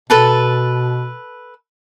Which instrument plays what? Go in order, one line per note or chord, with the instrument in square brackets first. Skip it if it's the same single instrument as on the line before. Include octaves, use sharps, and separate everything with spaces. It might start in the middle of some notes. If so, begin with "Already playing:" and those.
[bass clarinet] B2 [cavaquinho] A4 B4 A5